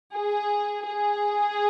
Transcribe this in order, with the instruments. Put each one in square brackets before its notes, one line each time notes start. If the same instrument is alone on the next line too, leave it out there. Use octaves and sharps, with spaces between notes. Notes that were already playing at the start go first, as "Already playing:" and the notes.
[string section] G#4
G#4